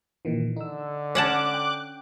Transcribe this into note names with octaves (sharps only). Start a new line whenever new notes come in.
A#2 D#3 E3
D3 D#4 E6
C#4 F#5 A5 D6 F#6
G5